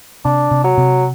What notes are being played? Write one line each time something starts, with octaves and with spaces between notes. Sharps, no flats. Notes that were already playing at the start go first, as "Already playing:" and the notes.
C3 D4
C3
F#3
C3